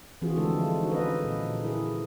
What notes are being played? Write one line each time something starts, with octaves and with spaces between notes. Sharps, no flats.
E3 F3 C4 F4 F#4 G#4
D3 F3 G#3 A3 D4 A4
D#4 F#4
C#4 A4 B4 D#5
A#2
E4 G#4 A#4